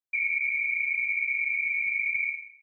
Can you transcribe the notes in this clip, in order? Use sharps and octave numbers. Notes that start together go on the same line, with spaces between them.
C#7 D7